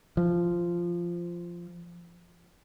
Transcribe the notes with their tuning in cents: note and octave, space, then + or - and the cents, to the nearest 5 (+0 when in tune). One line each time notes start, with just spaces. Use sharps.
F3 -10